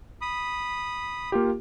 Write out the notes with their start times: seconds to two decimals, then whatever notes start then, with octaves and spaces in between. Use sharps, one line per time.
0.21 B5 D#6
1.32 A#3 F4 G4